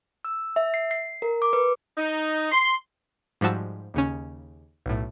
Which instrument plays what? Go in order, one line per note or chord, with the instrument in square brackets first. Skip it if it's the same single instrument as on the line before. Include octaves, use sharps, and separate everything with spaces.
[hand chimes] E6
E5
C7
C7
A#4
D6
B4
[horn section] D#4
C6
[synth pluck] G#2 F3 G3 F#4 A5 E6
D#2 C#3 C#4
B1 A2